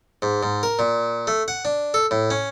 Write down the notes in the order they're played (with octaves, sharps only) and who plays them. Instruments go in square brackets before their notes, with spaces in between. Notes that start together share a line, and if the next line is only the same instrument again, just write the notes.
[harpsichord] G#2
G#2
A#4
A#2
A3
F#5
D4
A4
A2
C#4